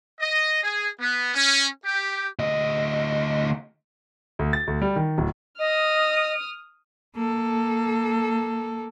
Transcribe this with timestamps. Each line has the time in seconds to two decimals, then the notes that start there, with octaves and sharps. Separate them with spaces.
0.20 D#5
0.62 G#4
1.00 B3
1.33 C#4
1.84 G4
2.39 D2 D#5
4.39 D2
4.53 A6
4.67 D2
4.82 G3
4.96 D#3
5.18 D1
5.59 D#5 D#6 F6
7.15 A#3 A4